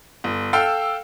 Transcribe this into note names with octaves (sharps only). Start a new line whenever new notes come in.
G1
A4 F5 G5 E6